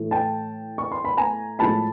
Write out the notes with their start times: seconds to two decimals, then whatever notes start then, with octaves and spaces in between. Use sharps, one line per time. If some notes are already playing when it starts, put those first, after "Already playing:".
Already playing: A2 E3 A3
0.11 G5 A5
0.78 C#6
0.92 C6
1.05 B5
1.17 G#5 A#5
1.59 A2 F3 G#3 A5 B5